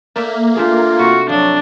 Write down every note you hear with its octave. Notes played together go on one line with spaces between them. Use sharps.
A3 A#3 D5 E5
A3 D4 F4 G#4
C3 F#4
F3 F#3 D4